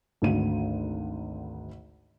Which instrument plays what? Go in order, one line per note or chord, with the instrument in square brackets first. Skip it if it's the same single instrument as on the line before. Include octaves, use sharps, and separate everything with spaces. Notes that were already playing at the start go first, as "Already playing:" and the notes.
[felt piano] G#1 D2 D#7